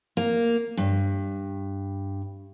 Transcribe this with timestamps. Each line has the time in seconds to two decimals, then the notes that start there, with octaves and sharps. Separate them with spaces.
0.17 A#3
0.77 G2